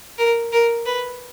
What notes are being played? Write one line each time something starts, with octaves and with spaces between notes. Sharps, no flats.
A#4
A#4
B4